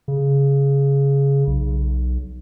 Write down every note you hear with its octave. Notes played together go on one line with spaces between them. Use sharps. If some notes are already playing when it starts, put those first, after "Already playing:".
C#3
B1